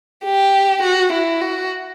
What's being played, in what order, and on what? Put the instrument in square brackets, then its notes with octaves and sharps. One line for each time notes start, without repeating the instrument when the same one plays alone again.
[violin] G4
F#4
E4
F#4